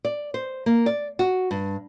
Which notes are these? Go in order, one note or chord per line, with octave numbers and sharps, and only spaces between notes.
D5
C5
A#3
D5
F#4
G2